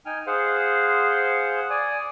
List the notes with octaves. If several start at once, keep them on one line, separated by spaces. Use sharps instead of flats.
D#4 G5 G#5 F6
G#4 C5 F5 F#5
D5 G#5 D#6